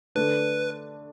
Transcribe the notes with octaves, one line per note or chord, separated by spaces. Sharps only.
D3 A3 D4 B4